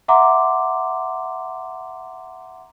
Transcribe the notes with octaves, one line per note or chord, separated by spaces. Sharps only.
E5 F#5 A#5 C6 D6